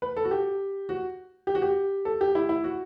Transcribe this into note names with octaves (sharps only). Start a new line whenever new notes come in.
B4
A4
F#4
G4
F#4
G4
F#4
G4
A4
G4
E4
E4
F#4